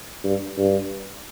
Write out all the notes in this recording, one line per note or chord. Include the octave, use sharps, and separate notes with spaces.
G2
G2